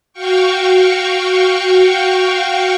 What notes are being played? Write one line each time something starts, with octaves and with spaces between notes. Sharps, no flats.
F#4 F5 G5 C#6